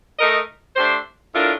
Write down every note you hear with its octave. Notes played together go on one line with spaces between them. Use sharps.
A3 D#4 A#4 D#5
A3 D4 G4 C5
A2 A3 D4 F4 A#4